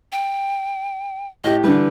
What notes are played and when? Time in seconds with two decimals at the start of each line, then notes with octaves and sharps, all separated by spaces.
0.12 G5
1.44 A2 G4 D#5
1.64 D3 E3 G3 B4